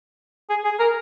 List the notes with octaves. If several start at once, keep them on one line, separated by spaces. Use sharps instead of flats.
G#4
G#4
A#4